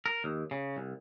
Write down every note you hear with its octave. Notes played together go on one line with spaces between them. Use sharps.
A#4
D#2
C#3
C2